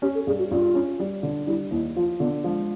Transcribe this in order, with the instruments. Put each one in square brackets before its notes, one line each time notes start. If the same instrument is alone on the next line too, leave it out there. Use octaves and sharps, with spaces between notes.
[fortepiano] C#4 [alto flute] G4
[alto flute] A4
[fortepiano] G2 [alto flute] G#4
[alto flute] F#4
[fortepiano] G2 [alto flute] F4
[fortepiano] C#4
G3
D3
[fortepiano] G3 [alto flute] E4
[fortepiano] D#2 [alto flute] E4
[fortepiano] F3 [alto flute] F4
[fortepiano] D3 [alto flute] B3
[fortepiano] F3 [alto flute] G#3